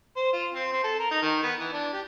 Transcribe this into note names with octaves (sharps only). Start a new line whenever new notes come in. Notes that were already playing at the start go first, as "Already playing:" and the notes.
C5
F4
C4
C4
A4
A#4
D#4
D#3
B3
E3
D4
G4